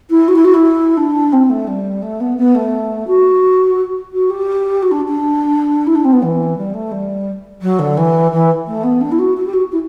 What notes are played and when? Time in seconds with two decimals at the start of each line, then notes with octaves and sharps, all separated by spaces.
0.10 E4
0.28 F#4
0.35 E4
0.44 F#4
0.53 E4
0.97 D4
1.32 C4
1.49 A3
1.67 G3
2.02 A3
2.20 B3
2.37 B3
2.54 A3
3.07 F#4
4.12 F#4
4.30 G4
4.82 F#4
4.91 D4
5.07 D4
5.86 E4
5.95 D4
6.04 C4
6.12 B3
6.22 E3
6.57 G3
6.73 A3
6.91 G3
7.61 F#3
7.79 D3
7.97 E3
8.31 E3
8.67 A3
8.83 B3
9.01 D4
9.11 E4
9.18 F#4
9.36 F#4
9.45 G4
9.53 F#4
9.72 E4